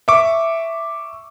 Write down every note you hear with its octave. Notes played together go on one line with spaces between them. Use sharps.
E5 C#6 D6